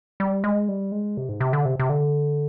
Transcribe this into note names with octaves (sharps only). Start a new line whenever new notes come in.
G3
G#3
G3
G#3
C3
G#2
C3
D3
C3
C3
D3